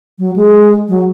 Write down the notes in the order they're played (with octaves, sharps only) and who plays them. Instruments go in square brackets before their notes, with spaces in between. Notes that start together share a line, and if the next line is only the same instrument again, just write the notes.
[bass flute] F#3
G#3
F#3